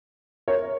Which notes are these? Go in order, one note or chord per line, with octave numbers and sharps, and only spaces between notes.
A#4 C#5